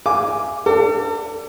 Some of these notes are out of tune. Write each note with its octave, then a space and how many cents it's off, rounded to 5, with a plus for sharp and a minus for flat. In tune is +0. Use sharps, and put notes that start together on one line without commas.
F5 -35 G#5 +0 D6 +0
D4 +0 A4 +40 D6 +0